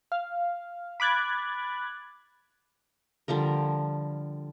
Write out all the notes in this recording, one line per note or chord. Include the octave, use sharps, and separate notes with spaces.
F5
B5 D6 F#6 G#6 A6
D3 F3 G3 A#4